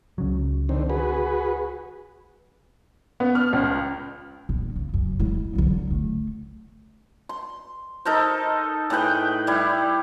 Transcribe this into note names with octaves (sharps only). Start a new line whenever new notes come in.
C#2 C#3 F#3
D3 D#3 C4
F#4 G#4 B4
B3
F6
C#2
A#1
C#3
F#2
G#3 E4
D3 F#3
A3
C6
D#4 A4 A#4 C5
A2 G#4 B4 G5
G3 E4